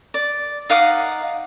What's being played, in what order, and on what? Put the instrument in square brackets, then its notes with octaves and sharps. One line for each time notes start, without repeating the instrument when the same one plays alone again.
[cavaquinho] D5
D#4 F5 F#5 D6